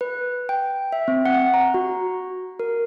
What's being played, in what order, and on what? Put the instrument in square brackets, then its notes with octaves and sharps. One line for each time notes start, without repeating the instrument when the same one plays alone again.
[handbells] B4
G5
E5
C4
F#5
A#5
F#4
A#4